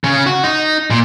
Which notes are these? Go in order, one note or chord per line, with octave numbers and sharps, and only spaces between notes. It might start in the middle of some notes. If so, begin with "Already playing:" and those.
C#3
F#4
D#4
A#2